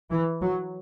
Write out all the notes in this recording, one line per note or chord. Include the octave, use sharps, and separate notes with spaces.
E3
F#3